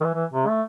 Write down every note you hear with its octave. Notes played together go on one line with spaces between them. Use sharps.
D#3
E3
E3
C3
A3